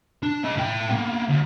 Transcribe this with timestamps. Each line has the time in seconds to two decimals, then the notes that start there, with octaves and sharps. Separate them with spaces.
0.23 D4
0.45 C#4 D#5
0.57 A2 G5
0.90 A#3 B3
1.30 D2